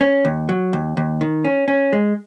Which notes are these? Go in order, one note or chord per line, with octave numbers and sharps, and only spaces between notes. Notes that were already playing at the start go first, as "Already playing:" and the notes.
C#4
D#2
F#3
D#2
D#2
D#3
C#4
C#4
G#3